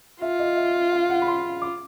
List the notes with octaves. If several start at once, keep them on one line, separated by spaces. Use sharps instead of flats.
F4 E5
D#5
E5
F5
F#5
B5
C6
D6